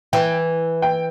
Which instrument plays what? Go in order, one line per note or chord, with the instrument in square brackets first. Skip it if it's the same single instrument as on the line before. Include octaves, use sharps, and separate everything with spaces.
[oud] E3 [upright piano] G5
[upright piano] G5